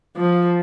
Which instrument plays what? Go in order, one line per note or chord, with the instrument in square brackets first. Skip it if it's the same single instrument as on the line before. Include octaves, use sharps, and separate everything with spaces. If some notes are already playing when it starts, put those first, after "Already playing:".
[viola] F3